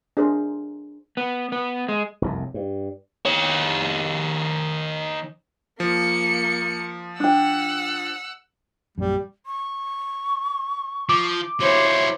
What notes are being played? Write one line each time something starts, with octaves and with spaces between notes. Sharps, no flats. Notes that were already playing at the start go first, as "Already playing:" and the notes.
D4 G#4 A#4 C5
B3
B3
G#3
F1 C2 F#2
G2
D#3 C#5
F3 A#3 C#7
D4 F#5 G5 E6
A#1 F#2 G3
C#6
F3 D6
F#3 E4 C5 C#5